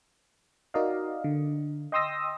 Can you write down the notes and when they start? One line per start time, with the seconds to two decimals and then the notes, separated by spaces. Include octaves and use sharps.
0.74 D#4 F#4 A#4 D5 D#5 F5
1.24 D3
1.92 D#5 G5 C6 D#6 E6 A#6